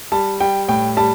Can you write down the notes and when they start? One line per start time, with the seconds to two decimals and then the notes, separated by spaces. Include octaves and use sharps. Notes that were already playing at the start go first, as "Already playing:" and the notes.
0.12 G3 A5
0.40 G3 G5
0.68 A2 G5
0.97 G3 A5